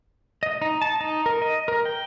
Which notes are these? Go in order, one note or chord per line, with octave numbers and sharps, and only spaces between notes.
D#5
D#4
A5
D#4
A#4
D#5
A#4
G5